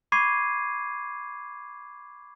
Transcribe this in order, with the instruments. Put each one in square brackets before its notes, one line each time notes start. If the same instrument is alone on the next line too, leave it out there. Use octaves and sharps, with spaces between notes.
[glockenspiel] B5 C#6 D6 G#6 C7 D#7